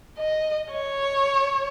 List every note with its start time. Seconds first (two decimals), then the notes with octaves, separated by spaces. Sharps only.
0.18 D#5
0.70 C#5